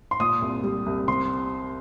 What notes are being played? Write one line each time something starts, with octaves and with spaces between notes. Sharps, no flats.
C6
A#2 D#6
C2
G3
C2
C3 C6